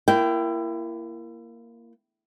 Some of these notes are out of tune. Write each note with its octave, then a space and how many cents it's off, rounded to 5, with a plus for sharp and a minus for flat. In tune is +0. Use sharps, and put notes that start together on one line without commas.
A#3 +0 E4 +30 G5 -10